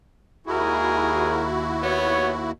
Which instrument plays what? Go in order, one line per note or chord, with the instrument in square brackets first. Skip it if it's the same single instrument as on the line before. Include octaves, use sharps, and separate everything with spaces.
[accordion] D#2 E4 F#4 [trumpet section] G#3 G#4 A#4
[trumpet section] B3 C#5